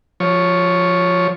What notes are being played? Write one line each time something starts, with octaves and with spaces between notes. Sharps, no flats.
F3 C#5